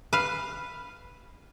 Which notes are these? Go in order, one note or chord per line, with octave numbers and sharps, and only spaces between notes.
B4 F5